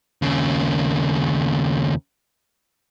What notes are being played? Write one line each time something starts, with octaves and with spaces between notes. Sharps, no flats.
D#2 C#3